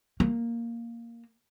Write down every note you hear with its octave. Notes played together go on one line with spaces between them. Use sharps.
A#3